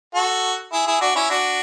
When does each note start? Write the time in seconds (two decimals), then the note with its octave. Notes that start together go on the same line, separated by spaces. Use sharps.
0.15 F#4 A4
0.72 E4 G#4
0.87 E4 G#4
1.01 D4 F#4
1.15 C#4 E4
1.30 D4 F#4